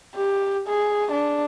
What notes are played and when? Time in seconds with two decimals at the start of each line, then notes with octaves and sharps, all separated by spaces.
0.15 G4
0.68 G#4
1.12 D4